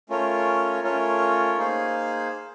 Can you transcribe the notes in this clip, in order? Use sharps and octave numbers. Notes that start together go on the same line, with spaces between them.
A3 C#4 F4 A#4 C#5
A3 C#4 F4 A#4 C#5
A#3 D#4 G#4 C5 F5